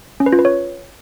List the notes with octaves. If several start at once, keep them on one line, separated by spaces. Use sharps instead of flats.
C#4
B4
F4
B4
C#5